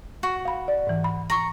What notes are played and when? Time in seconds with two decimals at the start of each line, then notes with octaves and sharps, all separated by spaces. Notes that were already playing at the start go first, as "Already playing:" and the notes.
0.23 F#4
0.45 F5 B5
0.68 D5
0.87 G#2 E3
1.04 B5
1.30 A#5 C#6